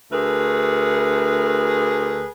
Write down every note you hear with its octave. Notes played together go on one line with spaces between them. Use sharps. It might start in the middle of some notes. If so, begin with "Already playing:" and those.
D2 A3 G#4 A#4 B4